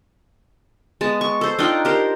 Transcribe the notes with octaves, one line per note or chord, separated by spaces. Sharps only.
G#3 B3 A5
C#6
A4 C5
D4 D#4 F4 G5
G4 A#4 C5